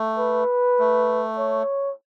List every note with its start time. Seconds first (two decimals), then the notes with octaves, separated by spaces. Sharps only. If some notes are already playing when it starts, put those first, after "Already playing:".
Already playing: A3
0.19 B4
0.79 A3
1.38 C#5